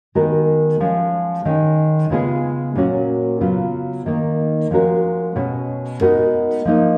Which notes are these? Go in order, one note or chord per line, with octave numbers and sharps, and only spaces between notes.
D#3 G#3 B3 F#4 A#4
F3 G#3 C#4
D#3 G#3 C#4
C#3 G#3 B3 F4 G#4
A#2 F#3 C#4 F#4
C#3 F#3 B3 F4
D#3 A#3 D#4
F3 G#3 C#4 F#4 A#4
B2 G#3 C#4 G#4
G#3 B3 D#4 F#4 A#4
F3 A#3 D#4 A#4